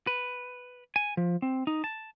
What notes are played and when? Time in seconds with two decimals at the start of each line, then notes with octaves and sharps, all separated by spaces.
0.07 B4
0.96 G#5
1.17 F3
1.42 C4
1.67 D#4
1.84 A5